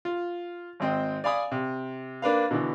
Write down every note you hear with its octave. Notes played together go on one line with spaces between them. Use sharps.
F4
G#1 G#3 C4 D#5 G5
D5 F5 G#5 B5 D#6
C3
A#3 D4 B4 F5
B2 D3 E3